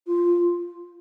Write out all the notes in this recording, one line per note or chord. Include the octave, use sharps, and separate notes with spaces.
F4